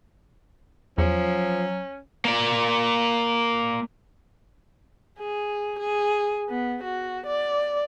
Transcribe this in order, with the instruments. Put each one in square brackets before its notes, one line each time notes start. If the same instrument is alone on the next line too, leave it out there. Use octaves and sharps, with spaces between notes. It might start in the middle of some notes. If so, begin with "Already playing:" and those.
[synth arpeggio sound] E2 [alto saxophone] F3 [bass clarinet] F#3 [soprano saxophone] C#4
[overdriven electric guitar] A#3 D5
[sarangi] G#4
G#4
B3
F#4
D5